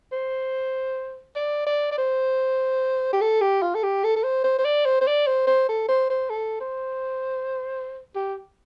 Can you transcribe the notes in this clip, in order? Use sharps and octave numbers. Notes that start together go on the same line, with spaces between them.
C5
D5
D5
D5
C5
G4
A4
G4
F4
A4
G4
A4
A4
C5
C5
C5
D5
C5
C5
D5
C5
C5
A4
C5
C5
A4
C5
G4